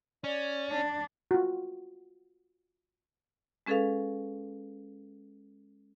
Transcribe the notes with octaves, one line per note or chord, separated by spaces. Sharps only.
C#4 D5
D4
F4 F#4
G#3 C#4 G#4 A4 B4 F5